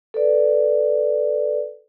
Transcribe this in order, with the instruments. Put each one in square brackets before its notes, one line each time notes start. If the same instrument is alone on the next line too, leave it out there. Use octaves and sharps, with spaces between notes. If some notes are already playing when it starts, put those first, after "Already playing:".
[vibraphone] A4 B4 D5